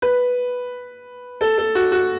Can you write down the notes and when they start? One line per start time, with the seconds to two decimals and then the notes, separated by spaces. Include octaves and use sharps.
0.02 B4
1.41 A4
1.58 A4
1.75 F#4
1.92 F#4